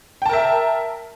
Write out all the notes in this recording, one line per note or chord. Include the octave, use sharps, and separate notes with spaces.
A#4 E5 G5 A5